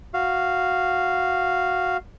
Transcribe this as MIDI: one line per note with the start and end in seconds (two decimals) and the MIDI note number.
0.14 1.97 66
0.14 1.97 77